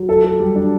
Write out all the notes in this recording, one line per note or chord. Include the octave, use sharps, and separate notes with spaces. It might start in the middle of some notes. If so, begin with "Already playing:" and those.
Already playing: F#3
A4
A4
G3
D4